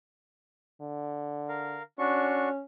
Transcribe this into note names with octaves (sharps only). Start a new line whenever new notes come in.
D3
A#4 F5
C#4 D4 F#4 C#6